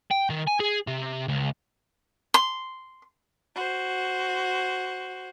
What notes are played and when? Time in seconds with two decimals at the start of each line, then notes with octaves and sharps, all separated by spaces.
0.11 G5
0.30 D#3
0.47 G#5
0.60 G#4
0.87 C3
1.28 C#2
2.34 C6
3.55 F#4 C5